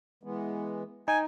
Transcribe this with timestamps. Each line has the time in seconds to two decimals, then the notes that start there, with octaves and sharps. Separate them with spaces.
0.23 E3 G#3 B3
1.08 D#4 G5 G#5